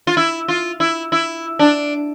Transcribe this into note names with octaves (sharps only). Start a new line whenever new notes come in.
F4
E4
F4
E4
E4
D4